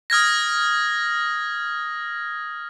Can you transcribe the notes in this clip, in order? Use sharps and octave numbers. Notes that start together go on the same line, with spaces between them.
D#6 F6 G#6 A#6